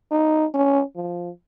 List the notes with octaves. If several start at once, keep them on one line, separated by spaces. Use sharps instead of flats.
D#4
C#4
F3